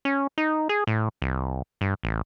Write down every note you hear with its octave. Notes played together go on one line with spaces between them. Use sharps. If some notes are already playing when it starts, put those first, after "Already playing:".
C#4
D#4
G#4
A2
C2
G2
A1